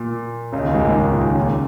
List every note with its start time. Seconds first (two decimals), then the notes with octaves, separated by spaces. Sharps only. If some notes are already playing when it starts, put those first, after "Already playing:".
Already playing: A#2
0.52 C#2 C#3
0.63 D#2 D#3
0.74 G#2 G#3
0.84 D#2 D#3
0.95 C#2 C#3
1.09 A#2
1.23 D#3
1.31 C#3
1.38 A#2
1.46 C#3